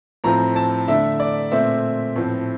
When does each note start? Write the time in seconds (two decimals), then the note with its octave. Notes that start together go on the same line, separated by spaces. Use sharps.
0.24 A2 F3 C4 A#5
0.56 A5
0.88 D3 A3 D4 E5
1.20 D5
1.52 A#2 A3 C4 E5
2.16 A2 F3 C4